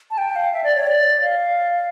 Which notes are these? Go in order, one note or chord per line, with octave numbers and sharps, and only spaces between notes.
A5
G5
F5
E5
D5
C#5
D5
F5